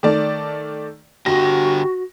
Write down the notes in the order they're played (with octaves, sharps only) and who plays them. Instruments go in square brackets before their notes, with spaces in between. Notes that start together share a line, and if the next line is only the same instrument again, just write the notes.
[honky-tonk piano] D#3 A3 D5
[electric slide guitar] D3 G4 [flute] F#4 [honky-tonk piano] A#6